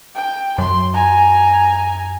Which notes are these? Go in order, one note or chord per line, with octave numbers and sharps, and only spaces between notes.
G5
F#2 C6
G#5 A#5